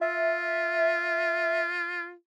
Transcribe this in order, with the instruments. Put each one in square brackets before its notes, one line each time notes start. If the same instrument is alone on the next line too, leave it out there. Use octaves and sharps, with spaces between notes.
[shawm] F4 [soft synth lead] E5